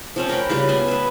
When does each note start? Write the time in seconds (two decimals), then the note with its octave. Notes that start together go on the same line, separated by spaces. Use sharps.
0.16 F3 C4 C#4
0.29 A#4 F#5 G5 B5
0.50 C#3 G3 F4 B4
0.69 B3 G#5
0.88 B4 E5